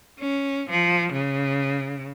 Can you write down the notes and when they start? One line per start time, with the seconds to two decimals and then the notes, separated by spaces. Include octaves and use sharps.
0.20 C#4
0.70 F3
1.13 C#3